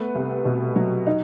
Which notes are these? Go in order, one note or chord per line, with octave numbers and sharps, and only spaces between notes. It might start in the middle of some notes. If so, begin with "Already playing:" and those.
Already playing: A3 B3
C2
B2
F#3
D#4